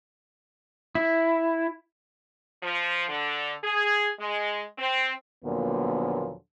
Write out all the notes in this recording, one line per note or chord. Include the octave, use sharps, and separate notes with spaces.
E4
F3
D3
G#4
G#3
C4
D#2 A#2 D3 F3 F#3 B3